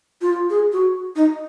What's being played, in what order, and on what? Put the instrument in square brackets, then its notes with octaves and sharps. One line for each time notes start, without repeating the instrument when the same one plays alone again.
[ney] F4
G#4
F#4
D#4